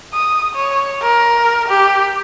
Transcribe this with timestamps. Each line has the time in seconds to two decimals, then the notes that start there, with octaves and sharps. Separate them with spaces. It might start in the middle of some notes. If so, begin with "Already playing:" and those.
0.13 D#6
0.55 C#5
1.02 A#4
1.68 G4